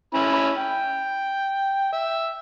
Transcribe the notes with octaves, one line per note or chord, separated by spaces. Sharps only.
C#4 E4 B5
G5
E5